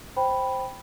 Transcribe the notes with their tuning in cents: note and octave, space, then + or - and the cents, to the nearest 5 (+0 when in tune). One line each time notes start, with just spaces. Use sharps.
C5 +0 G5 +0 B5 +0